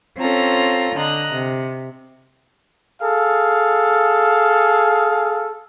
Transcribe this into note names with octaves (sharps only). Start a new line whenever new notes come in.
C4 C#4 F4 A4 A#5
D3 D#5 A#5 F#6
C3
G#4 A4 F5